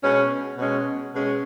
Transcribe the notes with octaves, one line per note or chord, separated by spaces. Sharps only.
B2 G#3 C#4
B2 G#3 C#4
B2 G#3 C#4